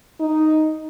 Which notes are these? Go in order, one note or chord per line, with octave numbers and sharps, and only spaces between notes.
D#4